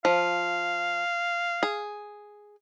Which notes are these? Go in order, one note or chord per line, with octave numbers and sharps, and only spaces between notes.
F3 F5
G#4